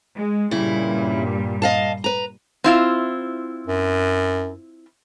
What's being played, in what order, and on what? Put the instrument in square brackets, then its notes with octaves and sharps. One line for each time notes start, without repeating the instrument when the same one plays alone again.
[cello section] G#3
[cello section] G2 A#2 G3 [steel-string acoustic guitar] C#3 E4
[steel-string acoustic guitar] D#5 F5 A5
B4 A#5
[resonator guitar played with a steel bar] C4 E4 F4
[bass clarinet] F#2